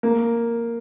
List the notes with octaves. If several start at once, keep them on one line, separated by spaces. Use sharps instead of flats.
A#3